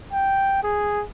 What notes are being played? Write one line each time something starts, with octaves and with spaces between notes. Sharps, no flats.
G5
G#4